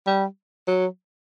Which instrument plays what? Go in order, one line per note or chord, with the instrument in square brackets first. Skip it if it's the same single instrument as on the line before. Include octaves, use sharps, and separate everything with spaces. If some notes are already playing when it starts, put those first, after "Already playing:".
[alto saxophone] G3
F#3